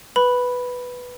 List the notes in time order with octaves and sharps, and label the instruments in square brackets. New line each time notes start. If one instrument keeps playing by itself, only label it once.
[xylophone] B4 B5